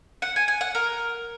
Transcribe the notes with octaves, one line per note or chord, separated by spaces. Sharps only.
F#5
G#5
G#5
F#5
A#4